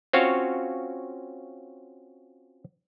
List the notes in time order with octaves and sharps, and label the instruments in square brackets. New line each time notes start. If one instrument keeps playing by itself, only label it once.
[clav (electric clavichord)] C4 C#4 F4 F#4 C#5 F5